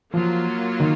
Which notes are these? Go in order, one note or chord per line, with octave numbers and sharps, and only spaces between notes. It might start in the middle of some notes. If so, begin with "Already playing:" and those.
F3 F#3 A#3 F4
D#3